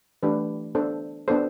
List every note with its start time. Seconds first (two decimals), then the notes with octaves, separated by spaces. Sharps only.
0.23 E3 A3 D4 G4 B4
0.75 B3 D4 A4 C5
1.28 B3 D4 A4 C5